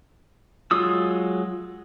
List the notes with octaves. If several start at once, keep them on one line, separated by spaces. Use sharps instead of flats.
F#3 G#3 F4 D#6 E6